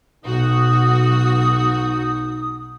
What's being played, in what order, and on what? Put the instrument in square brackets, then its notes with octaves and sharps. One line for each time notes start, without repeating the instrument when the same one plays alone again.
[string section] B1 F#4 [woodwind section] D#4 D#6